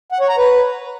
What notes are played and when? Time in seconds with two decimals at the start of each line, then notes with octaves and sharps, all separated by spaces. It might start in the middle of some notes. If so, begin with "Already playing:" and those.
0.12 F#5
0.20 C#5
0.29 A#5
0.38 B4